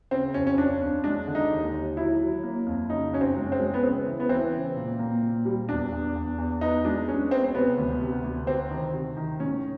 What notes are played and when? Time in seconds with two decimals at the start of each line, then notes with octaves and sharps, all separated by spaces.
0.11 C#3 C4
0.34 F2 C#4
0.47 C#4
0.58 F2 D4
0.81 F2
1.04 G#3 D4
1.27 D3
1.35 D#4
1.51 D#2
1.74 D#2
1.96 F#3 E4
2.20 F#3
2.43 A#3
2.67 F2
2.90 C#3 D#4
3.13 F#2 C#4
3.21 C4
3.36 G#3
3.52 C4
3.60 G#3
3.74 B3
3.83 C#3 C4
4.06 E3
4.20 B3
4.29 E3 C4
4.52 C#3
4.76 A#2
4.99 A#3
5.22 A#2
5.45 G3
5.69 E2 D4
5.92 E2
6.15 E2
6.38 E2
6.61 B3 D#4
6.85 G#3 D4
7.08 G#3 C#4
7.31 B3 C4
7.44 C4
7.54 C3 B3
7.78 D2
8.01 C3
8.24 D2
8.47 C3 C4
8.71 D#3
8.94 C3
9.17 D#3
9.40 A2 C#4